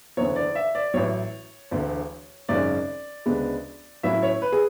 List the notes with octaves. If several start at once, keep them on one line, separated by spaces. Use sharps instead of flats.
F#1 E2 D3 C#5
D5
E5
D5
A1 A2 F#3 C#5
E1 D2 D3
G#1 F#2 C#3 G#3 C#4 D5
D2 C#3 G#3 B3 D4
A2 F#3 C#4 E4 E5
C#5
B4
G#4